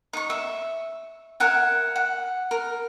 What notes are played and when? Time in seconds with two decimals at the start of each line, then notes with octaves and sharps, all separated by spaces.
0.13 D#4 C#6
0.30 E5
1.40 A#4 E5 F#5 G#5
1.96 F#5
2.51 A#4